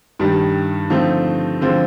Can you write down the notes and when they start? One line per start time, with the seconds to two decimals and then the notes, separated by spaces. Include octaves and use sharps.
0.19 G2 D#3 G3
0.90 D3 F3 A3 C4 D#4
1.61 D3 F3 G#3 C4